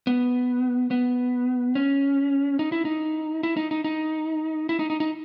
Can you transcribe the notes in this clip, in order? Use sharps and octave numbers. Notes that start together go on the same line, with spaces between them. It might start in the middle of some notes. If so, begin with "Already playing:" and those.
B3
B3
C#4
D#4
E4
D#4
E4
D#4
D#4
D#4
E4
D#4
D#4
D#4